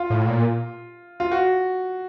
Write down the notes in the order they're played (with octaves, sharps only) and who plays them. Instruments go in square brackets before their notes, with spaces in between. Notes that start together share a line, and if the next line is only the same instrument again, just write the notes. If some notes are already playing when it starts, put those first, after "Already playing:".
Already playing: [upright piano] F4
[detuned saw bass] A2
A#2
[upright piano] F4
F#4